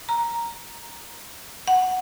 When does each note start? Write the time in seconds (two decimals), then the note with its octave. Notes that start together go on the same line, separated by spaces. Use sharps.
0.09 A#5
1.68 F#5